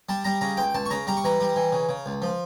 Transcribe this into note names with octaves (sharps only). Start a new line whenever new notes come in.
G3 A5
G3 A#5
C#3 A#5
C#2 G5
C#2 A5
C#6
C#3 A#5
G3 A#5
C#6
E3 A#5
G3
E3
C#3
C#3
C#2
F3